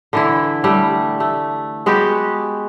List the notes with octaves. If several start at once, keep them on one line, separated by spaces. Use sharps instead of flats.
D3 E3 E4
G3 A3
A3
G#3 B3 F#4 G4